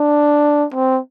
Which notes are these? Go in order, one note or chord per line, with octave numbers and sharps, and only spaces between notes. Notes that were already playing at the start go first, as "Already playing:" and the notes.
Already playing: D4
C4